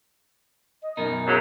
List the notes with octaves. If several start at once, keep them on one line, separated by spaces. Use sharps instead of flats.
D#5
F#2 B2 D#4 A#4
G#2 C#3 F#3